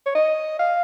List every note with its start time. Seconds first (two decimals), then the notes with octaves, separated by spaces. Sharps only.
0.06 C#5
0.15 D#5
0.59 F5